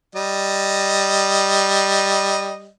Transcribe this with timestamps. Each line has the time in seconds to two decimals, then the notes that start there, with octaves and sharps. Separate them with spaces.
0.15 G3 D#5